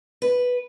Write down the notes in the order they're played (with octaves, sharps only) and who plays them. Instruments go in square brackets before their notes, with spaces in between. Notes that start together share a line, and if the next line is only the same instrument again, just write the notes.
[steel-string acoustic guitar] B4